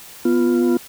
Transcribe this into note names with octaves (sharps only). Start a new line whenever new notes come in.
B3 F4